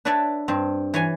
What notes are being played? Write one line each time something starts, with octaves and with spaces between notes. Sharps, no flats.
D4 B4 C#5 D5 E5 A5
G2 C4
E3 C#5 G#5